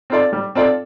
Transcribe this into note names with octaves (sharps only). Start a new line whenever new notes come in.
C4 F4 A4 D5
G3
C4 F4 A4 D5